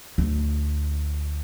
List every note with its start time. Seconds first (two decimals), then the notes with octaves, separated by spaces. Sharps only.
0.18 D2